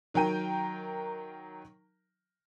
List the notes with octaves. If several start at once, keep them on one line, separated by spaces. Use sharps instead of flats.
D#3 F#3 A#4 G5 D#7